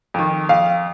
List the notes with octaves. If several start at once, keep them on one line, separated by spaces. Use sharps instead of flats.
F2 D#3
F2 F5